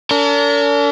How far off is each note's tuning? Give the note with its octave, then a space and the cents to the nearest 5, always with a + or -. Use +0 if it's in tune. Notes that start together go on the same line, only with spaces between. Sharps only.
D4 -45 A#4 -40